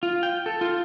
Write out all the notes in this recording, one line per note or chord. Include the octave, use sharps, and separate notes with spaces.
F4
G5
A4
F4